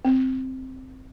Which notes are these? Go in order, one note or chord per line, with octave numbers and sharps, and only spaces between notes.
C4